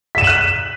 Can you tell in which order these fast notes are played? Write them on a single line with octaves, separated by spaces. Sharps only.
B6 E7 D#7 F#7 F#6